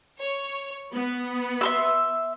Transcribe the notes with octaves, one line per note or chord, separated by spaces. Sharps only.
C#5
B3
E5 C6 E6